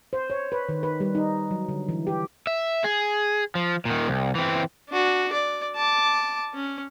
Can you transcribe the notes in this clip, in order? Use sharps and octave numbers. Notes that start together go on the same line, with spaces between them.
C5
C#5
B4
D#3
B4
G3
D#4
F#3
D3
E3
G4
E5
G#4
F3
A#2 D#3
C2
E3 C4
D4 F#4
D5
A5 D6
C#4